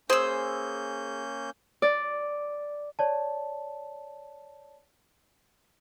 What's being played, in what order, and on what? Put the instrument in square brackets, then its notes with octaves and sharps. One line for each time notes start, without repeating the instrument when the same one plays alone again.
[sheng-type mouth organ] A#3 C#4 G6 [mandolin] G#4 E6 [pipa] C5
[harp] D5
[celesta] C#5 D5 A5